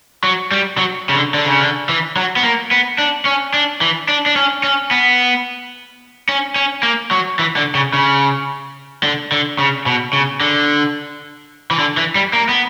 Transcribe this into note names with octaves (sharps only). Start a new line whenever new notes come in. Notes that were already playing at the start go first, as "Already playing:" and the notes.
F#3
G3
F#3
C#3
D3
D3
C#3
D3
E3
F#3
B3
A#3
B3
D4
C#4
D4
E3
D4
D4
C#4
C#4
B3
C#4
C#4
A#3
F#3
E3
D3
C#3
C#3
D3
D3
C#3
B2
C#3
D3
E3
D3
E3
G3
A#3
B3